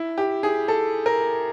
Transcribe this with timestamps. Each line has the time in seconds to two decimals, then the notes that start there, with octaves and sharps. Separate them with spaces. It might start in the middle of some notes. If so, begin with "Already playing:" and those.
Already playing: E4
0.18 G4
0.43 G#4
0.68 A4
1.06 A#4